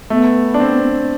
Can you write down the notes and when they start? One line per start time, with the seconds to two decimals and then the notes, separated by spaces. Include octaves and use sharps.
0.10 A3 B3
0.54 D4
0.60 C4